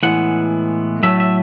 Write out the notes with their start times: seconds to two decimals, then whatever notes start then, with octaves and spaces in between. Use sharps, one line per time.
0.03 A2 E3 G#3 B3 F#5
1.03 A2 F#3 A3 E5
1.20 E5